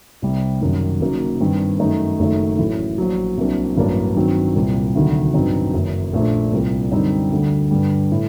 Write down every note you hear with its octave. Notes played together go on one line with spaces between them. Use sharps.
C2 C3 G3 C4
F#1 F#2 D#3 G3
F#1 F#2 F#3 A#3 D#4
G2 D#3 G3 C4
F#2 D#3 A3 D#4
F#1 F#2 D#3 A3 D#4
A1 A2 F#3
A#1 A#2 F#3
C2 C3 F#3 A#3 D4
A1 G2 F#3 A#3 D4
G2 D#3 F#3 C4 D#4
C2 A#2 G3 A#3
D2 C3 D#3 F#3
A1 G2 F#3 C4 D#4
F#1 F#2 D#3
A#1 A#2 A3 D4
C2 A#2 G3 A#3
F#2 D3 G3 C4 D#4
D2 D3 G3
G2 D3 G3
A2